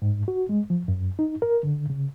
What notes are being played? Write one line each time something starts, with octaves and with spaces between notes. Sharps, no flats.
G#2
F#4
G#3
F3
F#2
D#4
A#4
D3
C#3